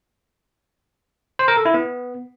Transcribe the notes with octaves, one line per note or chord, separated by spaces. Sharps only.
C5
A#4
A4
E4
B3